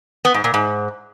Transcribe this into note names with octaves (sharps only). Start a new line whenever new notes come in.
B3
G#2
A#2
G#2